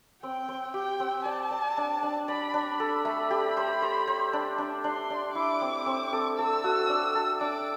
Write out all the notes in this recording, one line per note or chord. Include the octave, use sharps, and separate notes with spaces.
C4 G5
C4
G4 G5
C4
D5 A5
D5
D4
D4
D5 B5
D4
A4 B5
A3
G4
C5
C5
C5
D4
D4
D4 C6
D4
E4 D6
C4
C4
A4
A4 E6
F#4
D4
A4
D4 D6